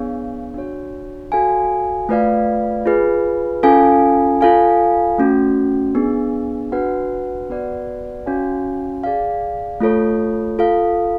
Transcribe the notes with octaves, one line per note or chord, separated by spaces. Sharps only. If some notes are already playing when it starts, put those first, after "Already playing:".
Already playing: B3 D4 G#4 C#5 F5
D4 F#4 C#5
F#4 A4 F5 G#5
A3 F4 B4 D5 F5
F4 G#4 B4
C#4 F4 A4 F5 G#5
F4 A4 F5 G#5
A3 C#4 F#4
B3 D4 G#4
D4 F#4 B4 F#5
B3 F#4 B4 D5 F#5
C#4 F#4 C#5 F5 G#5
G#4 D5 F5
A3 F4 A4 C#5
F4 A4 F5